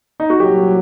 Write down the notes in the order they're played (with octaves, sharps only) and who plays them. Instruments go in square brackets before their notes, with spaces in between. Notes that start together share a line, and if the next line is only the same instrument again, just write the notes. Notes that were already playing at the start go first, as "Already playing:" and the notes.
[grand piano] D#4
F#4
[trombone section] C2 A#2 F#3 [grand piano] G4